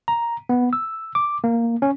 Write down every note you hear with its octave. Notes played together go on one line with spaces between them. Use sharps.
A#5
B3
E6
D6
A#3
C#4